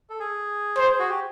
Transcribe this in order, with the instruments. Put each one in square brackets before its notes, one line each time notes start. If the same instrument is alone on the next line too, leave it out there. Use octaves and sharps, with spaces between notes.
[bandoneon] A4
G#4
[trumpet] C5
[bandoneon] F#4
G4